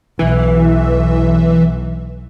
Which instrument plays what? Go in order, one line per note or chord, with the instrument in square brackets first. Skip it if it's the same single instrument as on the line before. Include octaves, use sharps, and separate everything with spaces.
[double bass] B1 [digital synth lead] E3